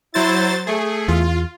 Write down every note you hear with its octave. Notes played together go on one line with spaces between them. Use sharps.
F#3 E4 C5 A6
A3 G#4
E2 F4